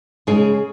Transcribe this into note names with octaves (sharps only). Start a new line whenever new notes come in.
C#3 G#3 C#4 G#4